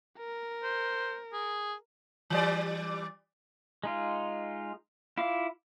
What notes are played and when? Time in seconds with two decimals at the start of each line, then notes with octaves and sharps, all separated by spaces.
0.18 A#4
0.63 C5
1.33 G#4
2.30 E3 G3 D5
3.84 G#3 D#4 F4
5.18 E4 F4 F5 D6